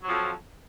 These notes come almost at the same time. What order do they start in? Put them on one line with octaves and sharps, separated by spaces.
F#3 F3 F2